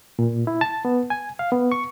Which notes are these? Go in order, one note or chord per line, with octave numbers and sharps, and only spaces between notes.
A#2
E4
A5
B3
G#5
F5
B3
C#6